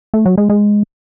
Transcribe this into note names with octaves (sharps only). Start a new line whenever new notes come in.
A3
F#3
G#3
G#3